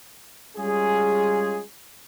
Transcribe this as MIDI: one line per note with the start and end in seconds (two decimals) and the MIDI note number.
0.56 1.60 55
0.56 1.60 56
0.56 1.60 61
0.56 1.60 65
0.56 1.60 68